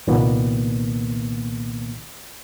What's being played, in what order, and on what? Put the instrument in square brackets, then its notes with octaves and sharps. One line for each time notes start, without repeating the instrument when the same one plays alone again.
[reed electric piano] C2 A#2 D#3 A#3 B3